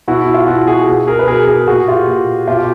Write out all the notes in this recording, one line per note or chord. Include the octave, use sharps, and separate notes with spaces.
B2 E4 F#4
E4
F4
B2 E4 F#4
F#4 G#4
B2
G#4 A#4
B4
B2 G#4 A#4
G#4 A#4
A#2 F#4 G#4
F4 G4
A#2
B2 F4 G4
G4